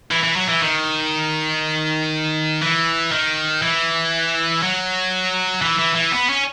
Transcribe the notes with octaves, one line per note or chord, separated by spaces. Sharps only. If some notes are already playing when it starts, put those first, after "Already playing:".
E3
E3
F#3
E3
D#3
E3
D#3
E3
F#3
E3
E3
E3
B3
C#4